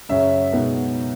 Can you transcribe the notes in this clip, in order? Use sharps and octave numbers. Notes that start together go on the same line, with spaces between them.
F#2 C#3 F#3 C#4 E5
B2 G#3 B3 D#4